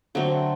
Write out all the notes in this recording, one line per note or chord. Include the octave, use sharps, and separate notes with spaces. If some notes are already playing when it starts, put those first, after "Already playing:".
D3 F#3 A3 C4 F#4